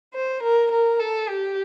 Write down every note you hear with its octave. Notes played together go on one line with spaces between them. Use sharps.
C5
A#4
A#4
A4
G4